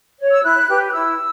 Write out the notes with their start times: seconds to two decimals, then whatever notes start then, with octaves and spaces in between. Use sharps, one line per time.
0.19 C#5
0.31 E6
0.43 E4 F#6
0.68 G4 B4
0.87 F#6
0.93 E4 E6